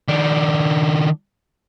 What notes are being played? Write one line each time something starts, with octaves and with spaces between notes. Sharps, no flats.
D#3 D4